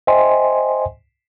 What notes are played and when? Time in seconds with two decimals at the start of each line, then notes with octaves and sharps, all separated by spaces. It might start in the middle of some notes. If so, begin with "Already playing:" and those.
0.07 C5 D#5 E5 G5 G#5 C6